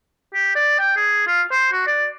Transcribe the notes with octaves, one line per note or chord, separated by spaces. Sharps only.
G4
D5
G5
G#4
F4
C5
F#4
D5